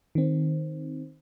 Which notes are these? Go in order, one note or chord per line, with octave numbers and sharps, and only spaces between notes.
D#3 C4